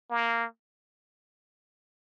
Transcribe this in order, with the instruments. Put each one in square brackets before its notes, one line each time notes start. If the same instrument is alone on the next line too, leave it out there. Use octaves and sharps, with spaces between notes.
[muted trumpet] A#3